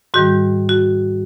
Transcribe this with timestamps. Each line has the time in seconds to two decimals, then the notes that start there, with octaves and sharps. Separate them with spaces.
0.14 G#2 D#3 G3 F#4
0.69 F#4